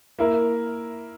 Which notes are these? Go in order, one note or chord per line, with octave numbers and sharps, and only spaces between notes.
A#3 E4 A#4